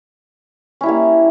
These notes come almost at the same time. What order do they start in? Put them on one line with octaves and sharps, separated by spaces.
C#4 E4 G3 A#3